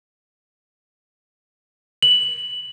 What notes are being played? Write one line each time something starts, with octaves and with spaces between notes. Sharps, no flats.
F#7